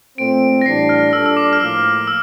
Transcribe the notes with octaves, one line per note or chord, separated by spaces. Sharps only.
A#2 A3 C4 D7
A#6
A2 E3 G3 D4 C7
F6
A#2 G3 D4 A4 E6
E6
D6
F6
A2 F3 A#3 E6
E6